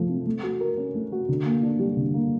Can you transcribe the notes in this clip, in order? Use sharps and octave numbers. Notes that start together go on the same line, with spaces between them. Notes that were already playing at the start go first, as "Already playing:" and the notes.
Already playing: F3 A3
C4
A3
F#4
A#4
C#4
A3
F#4
D3
A#3
D4
G3
D3
A#3